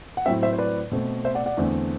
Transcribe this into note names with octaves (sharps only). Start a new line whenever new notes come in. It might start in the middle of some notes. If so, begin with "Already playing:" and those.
F#5
A2 F#3 C4 E5 G5
C5 E5
C5
B4 D5
B2 A3 C4
C5 E5
D5 F#5
D5 F#5
E2 D3 A3 C4